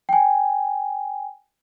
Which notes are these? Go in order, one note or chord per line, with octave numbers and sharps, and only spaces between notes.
G5 G#5